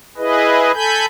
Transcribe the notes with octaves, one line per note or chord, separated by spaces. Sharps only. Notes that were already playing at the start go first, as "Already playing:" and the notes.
E4 G#4 B4 D#5
A4 G#5 B5 G6